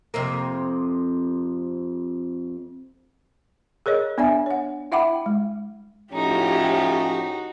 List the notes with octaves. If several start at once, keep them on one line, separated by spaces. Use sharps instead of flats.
F2 C3 A#3
G#4 A#4 C#5 D#5
B3 D4 D5 E5 G#5
C#5 F#5
E4 E5 F#5 G5 B5 D6
G#3
A2 F3 C#4 D#4 F#4 G4